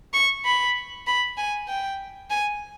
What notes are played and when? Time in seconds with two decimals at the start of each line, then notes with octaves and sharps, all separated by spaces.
0.13 C#6
0.45 B5
1.07 B5
1.37 G#5
1.68 G5
2.30 G#5